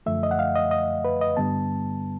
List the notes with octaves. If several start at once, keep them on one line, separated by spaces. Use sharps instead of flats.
F#2 D3 F3 A3 E5
D#5
F#5
F5
D#5
D#5
B4
D#5
G2 D3 G3 B3 A5